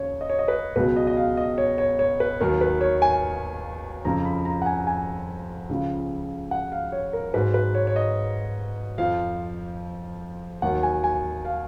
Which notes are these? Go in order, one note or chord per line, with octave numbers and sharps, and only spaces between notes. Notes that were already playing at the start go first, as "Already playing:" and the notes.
Already playing: D#2 C#3 C#5
D#5
C#5
D#5
B4
C#2 B2 F#3 B4
D#5
D#5
F5
D#5
C#5
C#5
C#5
B4
D#2 D#3 F#3 A#4
B4
C#5
G#5
F2 C#3 F3 A#5
B5
A#5
F#5
G#5
G#5
C#2 C#3 F3
F#5
F5
C#5
A#4
G#2 F#3 B4
B4
C#5
C#5
D#5
F2 F3 F5
D#2 D#3 F#3 F#5
G#5
G#5
F5